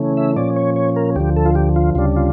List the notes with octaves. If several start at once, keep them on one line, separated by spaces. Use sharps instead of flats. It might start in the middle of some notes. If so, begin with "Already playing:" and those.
Already playing: C#3 E3 A3 C#4
E5
A#2 F3 C#4 D5
C#5
C#5
A#4
D2 D3 F3 G4
A4
F4
G4
F4
D2 C#3 G3 D4 F4
F4